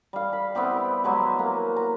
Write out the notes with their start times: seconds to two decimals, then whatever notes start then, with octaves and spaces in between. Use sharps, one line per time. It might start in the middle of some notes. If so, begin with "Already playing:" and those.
0.13 G3 F5
0.33 B5
0.55 B3 C4 E4 G4
1.04 F#3 G#3 G4
1.39 A#3
1.77 A#5